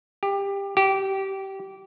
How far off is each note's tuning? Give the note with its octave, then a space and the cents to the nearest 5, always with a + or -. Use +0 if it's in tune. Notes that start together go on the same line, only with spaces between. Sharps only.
G4 +20
G4 -20